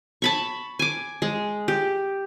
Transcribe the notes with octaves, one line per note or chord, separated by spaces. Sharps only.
A5 B5 C#6
G#5 D6
G#3
G4